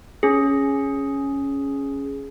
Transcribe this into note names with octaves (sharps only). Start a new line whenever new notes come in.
C#4 G#4